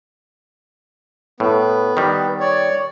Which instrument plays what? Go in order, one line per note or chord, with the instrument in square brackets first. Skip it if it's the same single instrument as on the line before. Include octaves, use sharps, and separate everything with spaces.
[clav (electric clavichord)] A2 [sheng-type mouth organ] B3
[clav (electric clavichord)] D#3 G3
[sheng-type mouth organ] C#5 D5